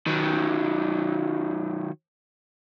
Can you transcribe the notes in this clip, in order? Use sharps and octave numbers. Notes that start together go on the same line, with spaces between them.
D#3 F#3